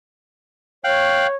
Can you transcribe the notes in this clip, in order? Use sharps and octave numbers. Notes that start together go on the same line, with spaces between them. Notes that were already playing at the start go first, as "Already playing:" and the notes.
C#5 F5 G5 F#6